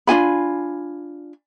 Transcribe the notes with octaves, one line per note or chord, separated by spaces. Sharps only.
D4 F4 G#5 B5